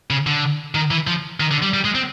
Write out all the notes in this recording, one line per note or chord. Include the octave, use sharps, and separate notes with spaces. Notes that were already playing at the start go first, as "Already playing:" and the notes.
C#3
D3
D#3
E3
F3
D#3
D3
G3
G3
G#3
C4